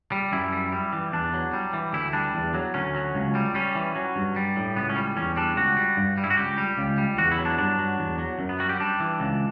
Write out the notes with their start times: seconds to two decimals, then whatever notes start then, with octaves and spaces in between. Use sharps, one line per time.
0.12 G3
0.32 F#2 E4
0.52 G3
0.72 G3
0.93 E3
1.12 E2 D4
1.33 F#3
1.53 G3
1.73 E3
1.93 D2 E4
2.13 G3 D4
2.34 E2
2.54 F#3
2.74 D2 C#4
2.95 F#3
3.15 C#2
3.35 G3
3.55 G3 C#4
3.75 E3
3.96 F#3
4.16 G2
4.36 G3
4.56 A2
4.76 C#2 B3
4.89 C#4
4.96 G3
5.16 E2 C#4
5.36 G3 D4
5.56 C#2 F#4
5.77 G3
5.97 G2
6.18 G3
6.24 E4
6.30 F#4
6.37 C#2 G4
6.58 G3
6.77 C#2
6.98 G3
7.18 E2 F#4
7.31 E4
7.39 F#3
7.45 D4
7.59 G2 D4
7.79 F#3
7.99 E2
8.19 F#3
8.39 F#2
8.49 B3
8.59 G3 F#4
8.69 G4
8.80 G3 D4
9.00 E3
9.20 C#2